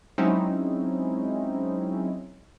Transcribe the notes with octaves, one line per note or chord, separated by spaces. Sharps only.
F#3 G#3 C4 C#4 D#4 E4